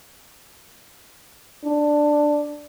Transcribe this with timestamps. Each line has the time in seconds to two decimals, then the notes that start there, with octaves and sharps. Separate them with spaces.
1.65 D4